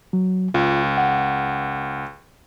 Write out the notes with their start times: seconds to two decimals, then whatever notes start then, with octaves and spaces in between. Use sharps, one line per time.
0.13 F#3
0.54 C#2 F4
0.98 F#5